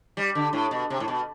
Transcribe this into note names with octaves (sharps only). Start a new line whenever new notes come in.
G3
D3
A2
B2
C3
A2
B2